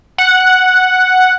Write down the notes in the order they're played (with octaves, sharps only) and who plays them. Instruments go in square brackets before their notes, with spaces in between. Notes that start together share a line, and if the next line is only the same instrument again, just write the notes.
[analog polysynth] F#5